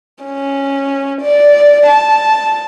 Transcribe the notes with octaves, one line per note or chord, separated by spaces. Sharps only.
C#4
D5
A5